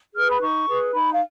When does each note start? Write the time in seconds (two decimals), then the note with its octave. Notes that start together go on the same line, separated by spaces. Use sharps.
0.15 G#4 B4 F6
0.30 B5
0.41 D#4 C#6
0.68 G#4 B4
0.94 D#4 B5
1.12 F5